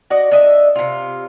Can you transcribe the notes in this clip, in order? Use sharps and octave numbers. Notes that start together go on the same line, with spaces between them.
F#4 D5 D#5
D4 D#5 E5
C3 F4